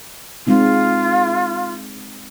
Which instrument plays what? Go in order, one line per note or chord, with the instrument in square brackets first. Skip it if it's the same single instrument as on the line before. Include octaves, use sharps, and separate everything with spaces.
[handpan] G#3 C4 D#4 [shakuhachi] F4